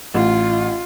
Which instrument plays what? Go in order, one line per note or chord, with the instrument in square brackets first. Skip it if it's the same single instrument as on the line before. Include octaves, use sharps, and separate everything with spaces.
[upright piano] A1 [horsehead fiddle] F4